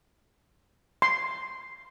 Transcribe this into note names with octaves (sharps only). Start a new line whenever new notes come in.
C6